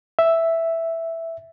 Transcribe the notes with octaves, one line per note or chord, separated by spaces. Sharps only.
E5